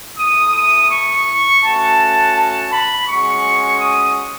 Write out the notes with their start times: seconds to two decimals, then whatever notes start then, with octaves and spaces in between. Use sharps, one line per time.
0.17 A3 E4 D#6
0.54 D#6
0.89 C#6
1.62 A3 C#4 F#4 A5
2.35 A5
2.71 B5
3.07 G#3 C#4 F#4 C#6
3.80 D#6